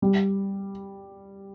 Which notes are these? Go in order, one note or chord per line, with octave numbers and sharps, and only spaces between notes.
G3